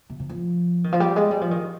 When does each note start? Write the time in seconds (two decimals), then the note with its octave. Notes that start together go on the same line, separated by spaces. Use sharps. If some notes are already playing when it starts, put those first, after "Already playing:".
0.10 C3
0.20 C3
0.30 F3
0.84 D#3
0.92 F3
1.00 G3
1.16 G#3
1.31 G3
1.41 F3
1.51 D#3